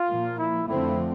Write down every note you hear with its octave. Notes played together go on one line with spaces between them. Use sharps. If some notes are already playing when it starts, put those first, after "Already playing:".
Already playing: F4
A#2 F3 A#3
E4
F2 D3 F3 A3 C4 E4